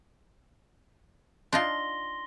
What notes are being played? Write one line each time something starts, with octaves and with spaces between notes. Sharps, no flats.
D4 D#4 F4 C6 A#6 G7